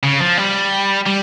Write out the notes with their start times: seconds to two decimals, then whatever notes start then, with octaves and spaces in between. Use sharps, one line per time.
0.03 C#3
0.20 F3
0.37 G3
1.06 G3